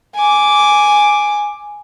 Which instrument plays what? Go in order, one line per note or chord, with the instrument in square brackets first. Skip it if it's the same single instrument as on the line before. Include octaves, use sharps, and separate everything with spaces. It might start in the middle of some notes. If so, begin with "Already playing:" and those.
[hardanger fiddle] G#5 D6